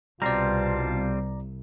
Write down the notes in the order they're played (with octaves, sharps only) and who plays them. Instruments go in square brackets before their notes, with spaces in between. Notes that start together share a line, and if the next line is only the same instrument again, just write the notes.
[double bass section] C2 [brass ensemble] B2 F4 A5 [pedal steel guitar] G3 C4 [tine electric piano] D5 A#5